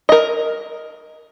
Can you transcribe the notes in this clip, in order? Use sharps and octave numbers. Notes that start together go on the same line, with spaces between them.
A#4 D#5